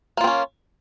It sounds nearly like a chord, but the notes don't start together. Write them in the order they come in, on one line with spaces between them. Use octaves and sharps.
A#3 F4 C4 C#4